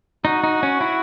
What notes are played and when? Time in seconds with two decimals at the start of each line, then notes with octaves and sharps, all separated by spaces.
0.25 D#4 F#4
0.44 D#4
0.63 C#4
0.81 E4